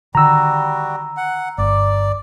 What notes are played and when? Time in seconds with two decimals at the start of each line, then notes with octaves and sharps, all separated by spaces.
0.15 D3 D#3 G3 F#4 A#5 E6
1.17 F#5
1.58 G1 D5